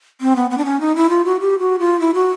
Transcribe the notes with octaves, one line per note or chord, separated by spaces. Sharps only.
C4
B3
B3
D4
C#4
D#4
E4
F4
F#4
G4
F#4
F4
E4
F#4